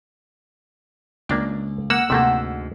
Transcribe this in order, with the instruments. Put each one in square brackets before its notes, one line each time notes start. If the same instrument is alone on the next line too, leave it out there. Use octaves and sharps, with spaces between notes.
[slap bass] C#2 [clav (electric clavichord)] A#3 D4 G5
[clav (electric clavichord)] A#3 [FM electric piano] F#5 E6
[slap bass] D2 G#2 [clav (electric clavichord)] C3 A3 A#3